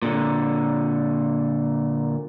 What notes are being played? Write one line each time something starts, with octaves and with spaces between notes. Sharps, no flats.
A#2 D3